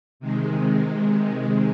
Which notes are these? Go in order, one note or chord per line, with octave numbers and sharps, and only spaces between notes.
C3 D#3 G#3